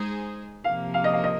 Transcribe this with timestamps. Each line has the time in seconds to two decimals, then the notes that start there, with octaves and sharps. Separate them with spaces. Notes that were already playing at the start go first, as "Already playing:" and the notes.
Already playing: G#3 D#4 G#4 C5
0.64 C3 F3 A#3 F5
0.94 F5
1.04 D#5
1.13 F5
1.24 D#5